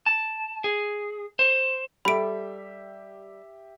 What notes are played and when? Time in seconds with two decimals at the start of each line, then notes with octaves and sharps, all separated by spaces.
0.06 A5
0.64 G#4
1.39 C5
2.05 G3 G4 A4 E5 B5 D7